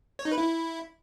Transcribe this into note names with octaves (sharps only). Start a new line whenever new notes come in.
C#5
D#4
B4
E4